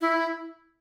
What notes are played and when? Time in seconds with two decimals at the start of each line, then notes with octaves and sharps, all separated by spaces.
0.01 E4